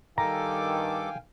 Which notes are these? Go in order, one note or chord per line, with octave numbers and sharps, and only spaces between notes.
G2 D#3 A4 F5 G5 G#5 A#5 D6